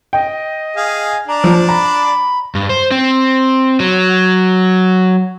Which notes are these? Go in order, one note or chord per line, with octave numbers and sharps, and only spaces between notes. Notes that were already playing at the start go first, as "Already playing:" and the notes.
D#5 G5
G#4 F5 G#5
D4 D5 A#5
F3
A#5 B5
G2
C5
C4
F#3